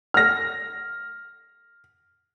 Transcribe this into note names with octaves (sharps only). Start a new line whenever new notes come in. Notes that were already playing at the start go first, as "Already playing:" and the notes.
F6 A#6